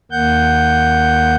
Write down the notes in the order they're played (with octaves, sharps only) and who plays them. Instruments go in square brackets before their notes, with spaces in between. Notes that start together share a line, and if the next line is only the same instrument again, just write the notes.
[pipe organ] D#2 A#3 F#5 G6